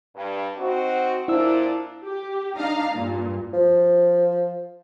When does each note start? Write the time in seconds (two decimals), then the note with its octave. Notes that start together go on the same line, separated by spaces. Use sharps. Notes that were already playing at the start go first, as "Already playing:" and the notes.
0.16 G2
0.57 C4 D#4 F#4
1.28 A#2 D4 E4 C5 E6
2.05 G4
2.57 D4 D#4 F5 A#5
2.93 G2 A#2
3.53 F3